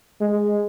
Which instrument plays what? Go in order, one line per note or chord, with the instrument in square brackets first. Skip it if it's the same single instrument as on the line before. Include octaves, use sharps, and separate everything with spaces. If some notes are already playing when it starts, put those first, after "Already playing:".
[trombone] G#3